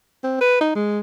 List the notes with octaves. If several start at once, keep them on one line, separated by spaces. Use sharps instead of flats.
C4
B4
D#4
G#3